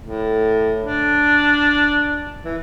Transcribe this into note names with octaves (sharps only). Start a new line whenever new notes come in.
A2
D4
E3